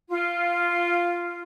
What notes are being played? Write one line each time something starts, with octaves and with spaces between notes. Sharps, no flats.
F4